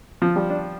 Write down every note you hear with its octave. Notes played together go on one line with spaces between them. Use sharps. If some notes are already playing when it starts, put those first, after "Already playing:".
F3
G3
D4